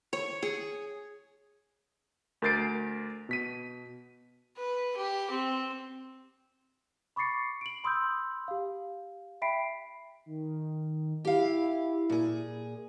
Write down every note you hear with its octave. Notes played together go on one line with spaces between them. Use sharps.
C#5
G#4
D2 A#4 G6 A6 C7 D7
B2 B6 D#7
B4
G4
C4
B5 C#6 D6 A6 C7 C#7
D7 F#7
B5 C6 D#6 E6 G6
G4 F5
E5 G5 B5 B6 C7 D7
D#3
E4 G4 F5
A#2 G#4